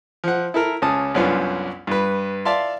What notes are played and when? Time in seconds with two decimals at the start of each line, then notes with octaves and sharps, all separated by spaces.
0.24 F3 F#5
0.54 E4 A4 A#4
0.82 C#2 C#4 A5 D#6
1.14 C2 F#2 B3 C#4 D4 F4
1.87 G2 B4
2.45 D5 E5 F5 A5 C6